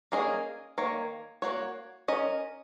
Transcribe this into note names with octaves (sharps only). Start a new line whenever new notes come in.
A#3 C#4 G#4 D#5
D#3 A#3 C#5
A#3 F#4 C#5
C#4 A#4 D#5